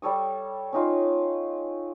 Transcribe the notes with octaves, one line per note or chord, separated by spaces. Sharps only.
G3 A4 C#5 D#6
C#4 D#4 F4